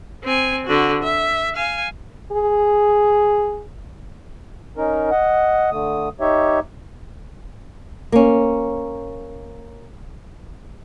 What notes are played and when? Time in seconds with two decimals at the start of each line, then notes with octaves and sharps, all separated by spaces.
0.24 C4 G#5
0.67 D3 F#4
1.03 E5
1.56 F5 G#5
2.32 G#4
4.77 C#4 D#4 A#4
5.11 D#5 F#5
5.71 D3 A3 D#6
6.20 D#4 G4 C#5 E5
8.12 A#3 C#4